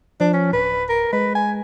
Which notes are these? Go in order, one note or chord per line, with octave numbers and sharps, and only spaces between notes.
F3 D4
C#4
D1 B4
A#4
G#3 B4
G#5